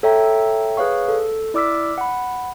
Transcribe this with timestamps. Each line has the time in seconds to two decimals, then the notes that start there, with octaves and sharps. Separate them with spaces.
0.03 A4 C#5 E5 G5 A#5
0.77 G#4 B4 C#5 F5 C#6
1.08 A4
1.54 E4 D5 D6 E6 F6 B6
1.98 F#5 B5